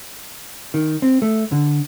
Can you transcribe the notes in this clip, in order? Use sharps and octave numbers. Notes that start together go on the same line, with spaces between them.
D#3
C4
A3
D3